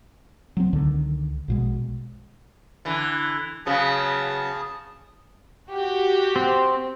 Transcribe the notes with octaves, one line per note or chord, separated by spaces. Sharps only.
F#3 A3 C4
C#2 D3 D#3
A#1 B2 G#3
D3 E3
C#3 F#3 B3 G#4 A5
F#4 G4
C4